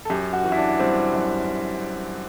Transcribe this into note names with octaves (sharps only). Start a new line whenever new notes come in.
A4
F#2 G4
F#4
E3
E4
D4
G3 C4
F#2